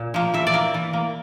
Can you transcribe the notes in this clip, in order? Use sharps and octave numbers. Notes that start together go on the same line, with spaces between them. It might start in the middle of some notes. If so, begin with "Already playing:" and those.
Already playing: A#2
F3 A#3
E3 E5
D5
A#3
E3
A#3